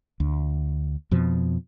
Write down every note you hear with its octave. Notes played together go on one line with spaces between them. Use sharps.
D2
F2 B2 F3